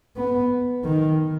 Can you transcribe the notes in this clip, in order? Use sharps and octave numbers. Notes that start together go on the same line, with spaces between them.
B3
D#3